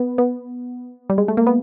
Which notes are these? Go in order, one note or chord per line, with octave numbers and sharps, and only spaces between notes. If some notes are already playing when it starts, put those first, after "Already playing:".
Already playing: B3
B3
G3
G#3
A3
A#3
B3